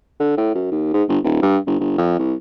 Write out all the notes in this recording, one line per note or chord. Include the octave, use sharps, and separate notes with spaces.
D3
A2
F#2
D#2
G#2
G1
D#1
G2
G1
G1
F2
C2